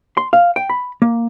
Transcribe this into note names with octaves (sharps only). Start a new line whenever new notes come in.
C6
F5
G5
B5
A#3